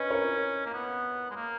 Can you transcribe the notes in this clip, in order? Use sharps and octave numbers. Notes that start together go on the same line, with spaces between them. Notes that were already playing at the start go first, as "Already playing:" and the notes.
Already playing: C#4 B4 D#5
A#4 C#5
A#3
B3
G#3
A#3